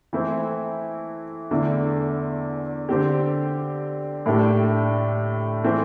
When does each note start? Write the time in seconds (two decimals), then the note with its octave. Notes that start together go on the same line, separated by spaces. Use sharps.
0.13 E3 A3 C4 E4
1.51 E2 D3 A3 E4
2.89 D3 C4 G4
4.26 A2 A3 D4 G4
5.64 E3 A3 C4